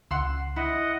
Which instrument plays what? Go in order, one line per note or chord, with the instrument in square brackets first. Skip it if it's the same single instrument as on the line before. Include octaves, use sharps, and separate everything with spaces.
[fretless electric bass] C#2 [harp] F#5 C6 E6
[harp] E4 [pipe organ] D#5 F#5